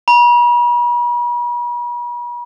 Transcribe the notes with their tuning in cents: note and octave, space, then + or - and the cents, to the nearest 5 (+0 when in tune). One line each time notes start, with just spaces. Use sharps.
B5 -45